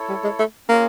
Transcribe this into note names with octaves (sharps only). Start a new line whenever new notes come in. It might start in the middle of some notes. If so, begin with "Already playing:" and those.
Already playing: E4 A4 C#5
G3
G#3
A3
A#3 C#4 F4 G#4 C#5